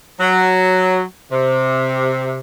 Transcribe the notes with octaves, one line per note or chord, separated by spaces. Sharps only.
F#3
C3